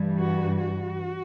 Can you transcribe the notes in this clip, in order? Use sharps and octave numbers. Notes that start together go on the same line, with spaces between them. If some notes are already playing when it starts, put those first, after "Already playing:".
Already playing: G2 E3 G3
F#4
F#4